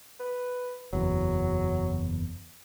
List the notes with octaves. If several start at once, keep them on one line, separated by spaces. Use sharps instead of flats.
B4
F#1 E2 F#3